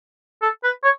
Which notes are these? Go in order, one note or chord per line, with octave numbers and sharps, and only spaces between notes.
A4
B4
C#5